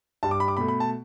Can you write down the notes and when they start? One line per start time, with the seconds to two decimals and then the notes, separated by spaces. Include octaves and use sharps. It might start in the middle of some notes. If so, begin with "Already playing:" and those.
0.23 G2 G3 A5
0.31 D6
0.40 B5
0.48 D6
0.57 B2 A3 B5
0.68 B5
0.80 A5